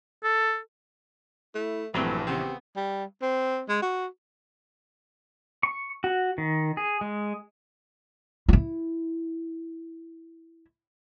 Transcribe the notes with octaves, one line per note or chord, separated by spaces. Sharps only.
A4
A3 E4
A#1 G2 E3 F#3 A3 C4 B4
C#3 B3 C4 G4
G3
C4
G#3
F#4
C#6
F#4
D#3
G#4
G#3
E4 F4